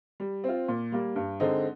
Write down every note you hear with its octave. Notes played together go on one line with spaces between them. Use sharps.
G3
C4 F4
A#2
G3 A#3
G2
D3 G#3 C4 D#4